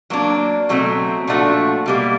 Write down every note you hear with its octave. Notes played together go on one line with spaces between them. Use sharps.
F#3 A#3 D4
B2 F#3 A3 C4
A#2 F3 A3 D4 F#4
B2 G3 A#3